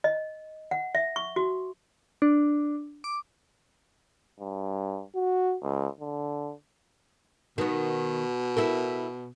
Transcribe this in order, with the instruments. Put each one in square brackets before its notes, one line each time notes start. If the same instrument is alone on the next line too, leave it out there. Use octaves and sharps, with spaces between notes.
[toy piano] D#5
F#5
E5
C#6
F#4
[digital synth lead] D4
D6
[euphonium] G2
F#4
C#2
D3
[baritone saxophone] B2 [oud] D#3 B3
[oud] E4 A4 A#4